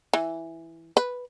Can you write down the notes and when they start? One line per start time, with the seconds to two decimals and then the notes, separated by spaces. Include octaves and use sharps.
0.13 E3
0.97 B4